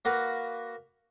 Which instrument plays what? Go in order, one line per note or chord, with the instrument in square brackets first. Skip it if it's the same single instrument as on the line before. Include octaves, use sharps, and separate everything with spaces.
[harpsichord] A#3 F#4 A#4 B4